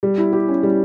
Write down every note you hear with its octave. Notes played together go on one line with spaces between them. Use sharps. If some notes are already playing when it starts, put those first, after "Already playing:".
G3
E4
G4
C#4
G3